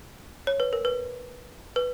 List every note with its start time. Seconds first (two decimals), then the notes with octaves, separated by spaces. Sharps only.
0.47 C#5
0.60 B4
0.73 A#4
0.85 B4
1.76 B4